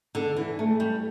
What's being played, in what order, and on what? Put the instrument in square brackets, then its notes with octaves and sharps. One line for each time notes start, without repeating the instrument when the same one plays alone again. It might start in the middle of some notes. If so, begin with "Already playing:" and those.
[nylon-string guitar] D3
E3
A3
G3